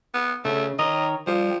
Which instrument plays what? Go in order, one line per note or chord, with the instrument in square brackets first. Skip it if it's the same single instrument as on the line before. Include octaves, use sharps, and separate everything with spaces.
[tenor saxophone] B3
[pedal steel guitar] C#3 [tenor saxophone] A3
[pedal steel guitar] D#3 A#4 C#5 [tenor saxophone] D#5
[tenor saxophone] F3 [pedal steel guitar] G3